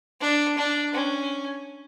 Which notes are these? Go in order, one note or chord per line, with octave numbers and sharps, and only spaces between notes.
D4
D4
C#4